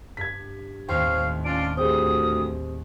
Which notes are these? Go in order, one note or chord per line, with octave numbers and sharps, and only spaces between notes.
G2 G#6 B6
D#2 A2 C4 C5 C#5 F5 G5
C#4 D4 F4 D7
D2 C4 G4 G#4 G5 D#6